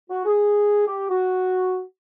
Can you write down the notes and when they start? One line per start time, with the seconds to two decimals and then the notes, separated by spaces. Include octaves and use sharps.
0.10 F#4
0.25 G#4
0.87 G4
1.10 F#4